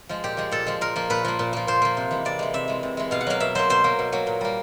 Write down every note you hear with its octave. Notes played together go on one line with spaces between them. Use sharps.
F3 G#3
A#2 G4
F3 G#3
A#2 A4
F3 G#3
A#2 A#4
F3 A#3
A#2 B4
F3 A#3
A#2
F3 A#3
A#2 C5
F3 A#3
C3
E3 G#3
C3 D5
E3 G#3
C3 E5
E3 G#3
C3
E3 G#3
B2 F5
F#5
F#3 A#3 F5
B2 E5
F#3 A#3 C5
B2 C5
F#3 A#3
B2
F#3 A#3
A#2
G3 A#3